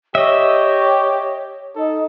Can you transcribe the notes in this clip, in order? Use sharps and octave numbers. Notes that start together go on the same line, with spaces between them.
G4 C#5 D#5 E5
D#4 A4